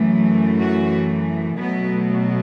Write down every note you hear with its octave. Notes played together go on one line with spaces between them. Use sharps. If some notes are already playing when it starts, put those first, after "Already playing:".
Already playing: F#2 E3 A3
F#4
B2 F#3 A3 B3